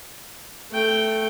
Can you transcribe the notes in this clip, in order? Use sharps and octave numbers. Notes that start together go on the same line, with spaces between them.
A3 G5